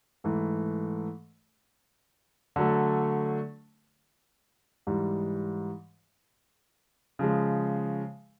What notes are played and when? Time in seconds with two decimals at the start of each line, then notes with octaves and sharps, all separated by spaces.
0.24 G#2 E3 A3
2.56 D3 F#3 A3
4.87 G#2 E3 G3
7.19 C#3 F3 G#3